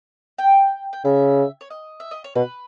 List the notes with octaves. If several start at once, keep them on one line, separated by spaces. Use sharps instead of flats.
G5
G5
C#3 E5
C#5
D#5
E5
D#5
C#5
B2 B4